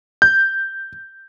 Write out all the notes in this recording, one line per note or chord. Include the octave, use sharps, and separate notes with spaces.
G6